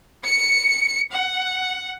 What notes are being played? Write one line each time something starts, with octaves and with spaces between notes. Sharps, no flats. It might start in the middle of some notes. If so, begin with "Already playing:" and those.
C#7
F#5